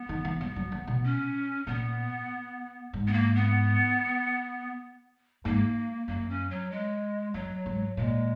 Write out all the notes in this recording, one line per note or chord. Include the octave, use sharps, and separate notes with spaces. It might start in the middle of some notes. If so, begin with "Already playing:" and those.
Already playing: B3
D#3
E3
F#3 B3
F#3
E3
B2
C#4
A#2 B3
G#2
B3
A#3
B3
G#2 A#3
F#2 A#3
C#4
F#3
G#3
F#2 F#3
G#2
A#2 G#3